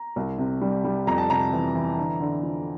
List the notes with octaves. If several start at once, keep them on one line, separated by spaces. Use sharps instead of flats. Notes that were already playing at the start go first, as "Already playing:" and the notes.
Already playing: A#5
C2
C3
G3
G3
F2 A#5
A5
C3 A#5
E3
E3
D3
D3
F3